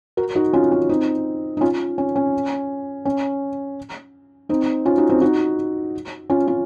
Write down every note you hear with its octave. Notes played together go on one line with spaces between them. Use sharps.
F#4 A#4
D#4 F#4
C#4 F4
C#4
C4 D#4
D#4
C#4 F4
C#4
C#4
C#4
C4 D#4
C#4 F4
D#4 F#4
C4 D#4
D#4 F#4
C#4 F4
C#4 F4